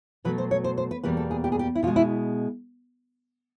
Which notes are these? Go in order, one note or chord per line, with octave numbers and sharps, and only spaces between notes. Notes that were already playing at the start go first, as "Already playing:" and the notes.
B2 F#3 A3 B4
C5
C#5
C5
C5
B4
E2 B2 G3 A#3 B4
A4
G#4
G4
G#4
G4
E4
B2 G#3 F4
E4